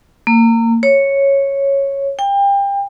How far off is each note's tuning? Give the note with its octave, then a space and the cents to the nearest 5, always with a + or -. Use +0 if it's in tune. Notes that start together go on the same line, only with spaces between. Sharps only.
A#3 -25
C#5 -5
G5 +30